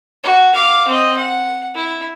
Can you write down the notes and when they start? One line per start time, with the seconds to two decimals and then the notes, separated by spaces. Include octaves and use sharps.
0.23 F#4
0.54 F5 D6
0.88 C4 D#5
1.16 F#5
1.75 E4